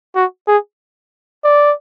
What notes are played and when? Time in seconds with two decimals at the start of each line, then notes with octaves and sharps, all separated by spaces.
0.15 F#4
0.48 G#4
1.44 D5